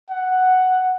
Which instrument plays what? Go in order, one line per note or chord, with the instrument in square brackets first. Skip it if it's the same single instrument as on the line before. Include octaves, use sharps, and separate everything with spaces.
[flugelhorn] F#5